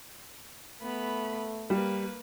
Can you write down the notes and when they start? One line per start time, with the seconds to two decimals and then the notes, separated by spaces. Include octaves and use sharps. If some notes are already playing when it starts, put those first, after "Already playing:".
0.82 A3 B3 B5
1.70 G3 A#3 B4